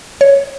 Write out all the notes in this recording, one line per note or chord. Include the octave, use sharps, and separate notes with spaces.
C#5